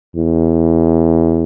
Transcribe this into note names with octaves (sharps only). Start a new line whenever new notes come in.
E2